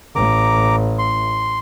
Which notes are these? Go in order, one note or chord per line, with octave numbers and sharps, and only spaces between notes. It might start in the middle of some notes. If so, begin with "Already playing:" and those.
A1 A#5 D6
C6